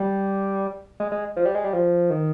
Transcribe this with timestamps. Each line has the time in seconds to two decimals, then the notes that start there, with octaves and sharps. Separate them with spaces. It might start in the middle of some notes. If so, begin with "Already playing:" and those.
Already playing: G3
1.00 G#3
1.12 G#3
1.37 F3
1.45 G3
1.55 G#3
1.64 G3
1.73 F3
2.10 D#3